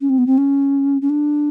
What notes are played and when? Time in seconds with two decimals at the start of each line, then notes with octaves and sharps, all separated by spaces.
0.01 C#4
0.10 C4
0.18 B3
0.27 C4
0.38 C#4
1.02 C#4
1.10 D4